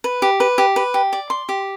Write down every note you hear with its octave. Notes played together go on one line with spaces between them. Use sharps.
B4
G4
B4
G4
B4
G4
D5
C6
G4